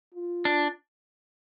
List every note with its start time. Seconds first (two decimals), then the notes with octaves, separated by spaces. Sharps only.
0.14 F4
0.45 D4